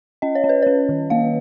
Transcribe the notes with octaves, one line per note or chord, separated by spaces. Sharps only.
C#4 D#5
C#5
C#4
B4
C#4 C#5
D#3
A#3 F5